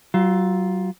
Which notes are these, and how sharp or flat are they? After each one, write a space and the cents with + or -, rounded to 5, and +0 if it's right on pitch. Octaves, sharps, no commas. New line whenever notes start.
F#3 +30 F4 +0